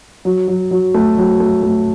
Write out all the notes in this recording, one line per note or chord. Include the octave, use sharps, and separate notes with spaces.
F#3
F#3
F#3
A3
F#3
A3
A3